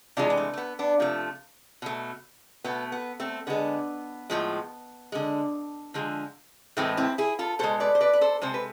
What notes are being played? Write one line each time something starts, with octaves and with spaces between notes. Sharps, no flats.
C3 E3 G#3 D4 F4
B3
A3
A3
B3
B3 D4
C3 F3 A3
B2 A3
B2 A3 B3
B3
A3 C4
D3 G#3 B3
A2 F3 G#3
D3 G#3
D3 F3 G#3
A2 E3 G#3 A3 C4
C4 E4
E4 G#4
F4 A4
B2 G#3 A4 C5
B4 D5
C5
B4 D5
B4
A4 C5
C3 G#3 A4 C5
B4